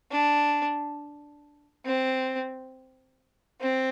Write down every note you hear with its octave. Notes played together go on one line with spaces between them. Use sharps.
D4
C4
C4